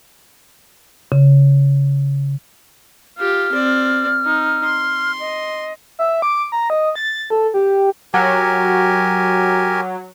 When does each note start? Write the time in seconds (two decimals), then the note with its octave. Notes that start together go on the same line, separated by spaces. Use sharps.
1.12 C#3
3.18 F4 G4 F6
3.52 C4 D5
4.25 D#4
4.64 C6
5.20 D#5
5.99 E5
6.22 D6
6.52 A#5
6.70 D#5
6.96 A6
7.30 A4
7.54 G4
8.14 F#3 G4 A#4 G#5